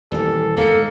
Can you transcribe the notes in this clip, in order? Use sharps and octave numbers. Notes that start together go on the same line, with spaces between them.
D#1 E3 G3 A#3 A4
D#1 G#2 A#3 A4 A6 C#7